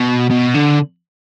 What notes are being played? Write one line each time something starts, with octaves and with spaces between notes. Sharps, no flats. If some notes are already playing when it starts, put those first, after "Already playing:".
Already playing: B2
B2
D3